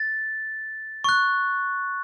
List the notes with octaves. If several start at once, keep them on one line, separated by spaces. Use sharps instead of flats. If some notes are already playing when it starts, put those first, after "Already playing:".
Already playing: A6
C#6 F#6